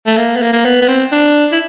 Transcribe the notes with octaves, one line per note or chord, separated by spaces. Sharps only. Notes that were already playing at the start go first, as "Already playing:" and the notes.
A3
A#3
B3
A#3
A#3
B3
B3
C4
D4
E4